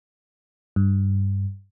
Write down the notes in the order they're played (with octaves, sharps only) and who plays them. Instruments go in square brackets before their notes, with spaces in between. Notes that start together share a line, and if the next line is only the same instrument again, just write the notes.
[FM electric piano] G2